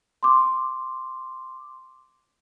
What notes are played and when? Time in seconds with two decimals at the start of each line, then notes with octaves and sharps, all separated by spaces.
0.23 C6 D6